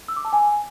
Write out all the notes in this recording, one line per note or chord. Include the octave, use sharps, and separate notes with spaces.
E6
D6
A5
G#5